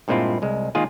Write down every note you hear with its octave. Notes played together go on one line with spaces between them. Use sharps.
G2 A#2 G#3 C4 E4 F4
C2 G#3
D#3 G#3 A#3 F4 G#4